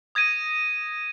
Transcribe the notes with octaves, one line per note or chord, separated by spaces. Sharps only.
D#6 G#6 A#6 D#7